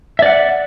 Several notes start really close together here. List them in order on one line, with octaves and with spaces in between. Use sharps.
E5 D5 F#5